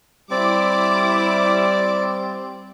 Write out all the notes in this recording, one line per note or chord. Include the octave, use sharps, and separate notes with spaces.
G3 C4 E4 D5 D6